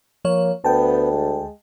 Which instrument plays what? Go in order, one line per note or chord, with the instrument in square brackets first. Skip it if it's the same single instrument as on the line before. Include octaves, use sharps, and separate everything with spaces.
[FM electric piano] F3 C#5 [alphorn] A#3
[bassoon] D2 [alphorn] B3 [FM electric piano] G5 A5
[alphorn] G#3